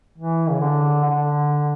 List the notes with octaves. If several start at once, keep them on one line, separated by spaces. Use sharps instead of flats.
E3
C#3
D3
D3